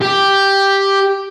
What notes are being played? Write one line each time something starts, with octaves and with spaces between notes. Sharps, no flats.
G4